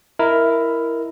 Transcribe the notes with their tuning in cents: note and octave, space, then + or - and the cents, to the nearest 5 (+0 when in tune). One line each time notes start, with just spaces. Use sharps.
E4 +10 A#4 +0 D#5 +25